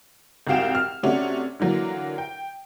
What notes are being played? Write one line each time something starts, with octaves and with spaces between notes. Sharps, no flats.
C2 G#2 F#4 F5 G5 E7
F6
C3 A3 C#4 D4 F#4
D3 E3 F#3 A#3
G5